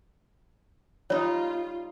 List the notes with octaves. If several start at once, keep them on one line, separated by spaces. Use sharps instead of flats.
G3 D#4 F4 C#5 D#6